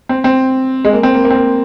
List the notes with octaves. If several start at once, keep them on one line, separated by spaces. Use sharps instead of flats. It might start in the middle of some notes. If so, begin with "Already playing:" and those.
C4
C4
G#3
A#3
C4
A#3
A#3
C4
A#3